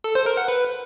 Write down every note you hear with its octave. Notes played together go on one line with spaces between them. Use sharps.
A4
C5
A#4
F#5
B4